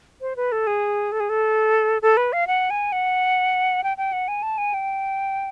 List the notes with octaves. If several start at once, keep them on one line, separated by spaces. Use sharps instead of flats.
C5
B4
A4
G#4
A4
G#4
A4
A4
B4
F5
F#5
G#5
F#5
G5
G5
F#5
G#5
A5
G#5
G5